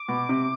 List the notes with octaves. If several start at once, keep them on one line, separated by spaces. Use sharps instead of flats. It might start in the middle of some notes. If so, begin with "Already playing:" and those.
Already playing: D6
B2
C3